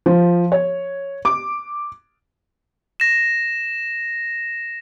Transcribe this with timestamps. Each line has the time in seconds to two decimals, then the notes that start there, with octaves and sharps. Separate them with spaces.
0.06 F3
0.52 C#5
1.25 D6
3.00 A#6 E7